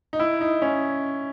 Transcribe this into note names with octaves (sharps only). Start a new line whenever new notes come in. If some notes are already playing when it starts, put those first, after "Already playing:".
D#4
E4
D#4
C#4